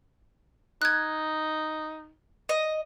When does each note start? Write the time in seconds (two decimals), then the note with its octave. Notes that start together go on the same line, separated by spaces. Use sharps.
0.82 D#4 F#6 G#6
2.49 D#5